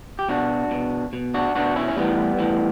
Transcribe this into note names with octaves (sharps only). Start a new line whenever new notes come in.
G4
B2 D4 F#4
B2
B2
D4 F#4
B2 D4 F#4
C#4 E4
C#4
A2 E3 G3 B3
A2 E3